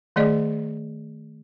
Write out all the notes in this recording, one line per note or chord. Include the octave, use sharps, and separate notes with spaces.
D#3 A3 G#4 D5 D#5